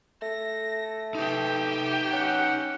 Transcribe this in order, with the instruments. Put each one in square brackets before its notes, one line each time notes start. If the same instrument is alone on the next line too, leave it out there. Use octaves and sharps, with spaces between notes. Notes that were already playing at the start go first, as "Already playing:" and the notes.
[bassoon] A3 [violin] A#6
[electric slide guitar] D#4 B4 [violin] G4 G5
[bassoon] C#4 [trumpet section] F#5